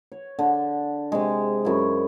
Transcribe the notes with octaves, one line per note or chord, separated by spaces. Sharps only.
C#5
D3
C3 G#3
F#2 E4